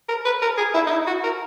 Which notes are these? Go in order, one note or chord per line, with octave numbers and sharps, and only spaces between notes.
A#4
B4
A#4
G#4
E4
D#4
E4
F#4
A#4